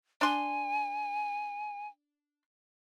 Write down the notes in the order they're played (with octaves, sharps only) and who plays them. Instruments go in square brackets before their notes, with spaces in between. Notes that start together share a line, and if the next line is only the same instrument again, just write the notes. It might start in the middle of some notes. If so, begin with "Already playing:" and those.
[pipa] D4 C6 [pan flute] G#5